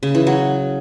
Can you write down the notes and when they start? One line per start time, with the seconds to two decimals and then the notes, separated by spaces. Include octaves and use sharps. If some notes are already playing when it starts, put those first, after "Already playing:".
0.03 C#3
0.15 E3
0.27 F#3